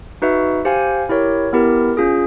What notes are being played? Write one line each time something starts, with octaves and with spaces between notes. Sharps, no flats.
D#4 F#4 B4 E5
G4 C5 F5 G#5
E4 G4 A#4 C#5
B3 E4 G4 A#4
C#4 F4 G#4